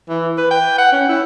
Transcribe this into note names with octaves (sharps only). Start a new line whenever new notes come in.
E3
B4
G5
F#5
C#4
E4